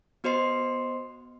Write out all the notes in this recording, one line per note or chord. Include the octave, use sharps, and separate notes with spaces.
B3 F#4 C5 D#5 C6 C7